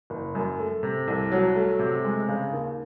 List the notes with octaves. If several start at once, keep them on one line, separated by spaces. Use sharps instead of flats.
F#1
F#2
A3
C3
C2
F#3
A3
C3
G#3
C#3
D#2